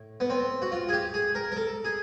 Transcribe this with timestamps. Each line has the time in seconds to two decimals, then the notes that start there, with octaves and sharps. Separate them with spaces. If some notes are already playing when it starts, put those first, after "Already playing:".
Already playing: A2
0.20 B3
0.30 C4
0.62 F#4
0.72 F4
0.89 G#4
0.93 G4
1.14 G#4
1.35 A#4
1.52 A#4
1.57 A4
1.85 G#4